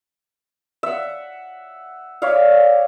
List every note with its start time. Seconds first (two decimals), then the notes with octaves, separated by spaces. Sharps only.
0.83 E5 F#5
2.22 C#5 D5 E5 F5